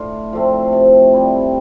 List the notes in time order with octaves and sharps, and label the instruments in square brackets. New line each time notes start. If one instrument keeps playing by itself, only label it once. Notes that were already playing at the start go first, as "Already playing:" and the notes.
Already playing: [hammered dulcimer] A2 D4 F4
F3 A3 C4
C3
G3 C4 E4